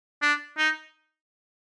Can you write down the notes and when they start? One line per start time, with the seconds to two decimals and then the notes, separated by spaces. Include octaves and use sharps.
0.22 D4
0.58 D#4